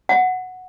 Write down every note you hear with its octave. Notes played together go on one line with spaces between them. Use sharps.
F#5